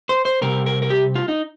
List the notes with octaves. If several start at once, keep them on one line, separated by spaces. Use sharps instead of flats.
C5
C5
C3 G3 C4 A#4
A#4
A#4
G4
F4
D#4